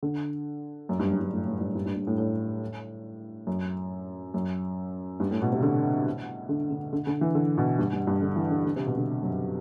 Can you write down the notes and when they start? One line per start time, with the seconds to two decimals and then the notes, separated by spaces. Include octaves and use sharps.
0.03 D3
0.89 F#2
0.99 G2
1.11 F#2
1.21 G2
1.33 A2
1.47 A2
1.61 G2
1.75 G2
1.86 G2
1.96 G2
2.07 A2
2.18 A2
3.47 F#2
4.34 F#2
5.20 G2
5.31 A2
5.42 B2
5.53 C3
5.62 D3
6.49 D3
6.71 D3
6.93 D3
7.07 D3
7.21 E3
7.35 D3
7.58 B2
7.79 G2
7.93 G2
8.07 G2
8.22 D3
8.36 E3
8.51 D3
8.64 D3
8.76 C3
8.87 B2
8.97 D3
9.22 F#2